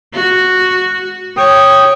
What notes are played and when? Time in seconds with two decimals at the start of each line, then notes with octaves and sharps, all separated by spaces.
0.14 F#4
1.37 C#5 G5 D#6